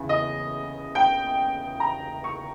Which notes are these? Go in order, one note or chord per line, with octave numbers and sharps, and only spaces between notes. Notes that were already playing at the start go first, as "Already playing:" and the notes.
Already playing: E2 C#3
D#5
G5
A#5
C#6